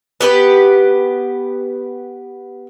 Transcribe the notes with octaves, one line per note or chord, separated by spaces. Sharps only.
B3 G4 G#4 B4